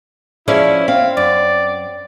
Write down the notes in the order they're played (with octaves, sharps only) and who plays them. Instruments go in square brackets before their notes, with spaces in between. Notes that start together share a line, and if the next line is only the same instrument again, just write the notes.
[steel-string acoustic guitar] F3 [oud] C#4 G#4 D5 [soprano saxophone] E4
[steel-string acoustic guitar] C4 [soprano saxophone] F5
[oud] F#2 [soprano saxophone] D5